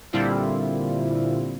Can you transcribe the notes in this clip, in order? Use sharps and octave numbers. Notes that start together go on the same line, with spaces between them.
A#2 D3 G3 C4 E4 F4